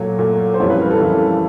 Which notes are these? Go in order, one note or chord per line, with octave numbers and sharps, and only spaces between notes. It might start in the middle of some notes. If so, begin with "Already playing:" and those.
Already playing: A#2 F#3 A3 C#5
A#2 F#3 A3
C5
F2 C#3 E3 G3 C#5
B4
A#4
A4
F2 C#3 E3 G3